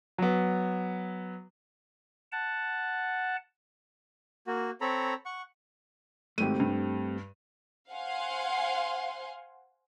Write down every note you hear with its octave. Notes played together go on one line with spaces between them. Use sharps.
F#3 B3
F#5 A5
A#3 F#4
C4 A4 C#5 A#5 B5
F#5 C#6
G#1 A3 C4 G4 D#7
G2
C5 F5 F#5 G#5 C6